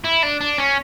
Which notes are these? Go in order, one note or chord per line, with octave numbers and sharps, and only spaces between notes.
E4
D4
D4
C#4